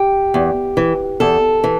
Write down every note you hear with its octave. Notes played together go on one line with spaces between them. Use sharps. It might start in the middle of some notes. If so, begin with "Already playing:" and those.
Already playing: G4
E2
E3
E2 A4
E3